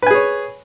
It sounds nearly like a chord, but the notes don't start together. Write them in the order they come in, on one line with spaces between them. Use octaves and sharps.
B4 G#5 G#4 C#5